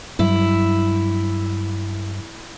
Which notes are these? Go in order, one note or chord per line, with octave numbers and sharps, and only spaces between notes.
G2 F#3 G3 E4